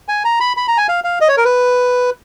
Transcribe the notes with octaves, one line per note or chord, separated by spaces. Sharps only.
G#5
A#5
B5
B5
A#5
G#5
F5
F5
D#5
C#5
A#4
B4